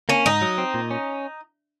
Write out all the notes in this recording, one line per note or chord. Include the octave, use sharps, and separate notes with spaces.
A#3 C#4
G#2 D#4
F#3
C4
A#2
C#4